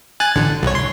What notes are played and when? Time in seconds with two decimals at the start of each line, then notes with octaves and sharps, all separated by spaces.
0.20 G#5 F#6 A6
0.36 A1 D3
0.63 C2 C#5
0.75 C6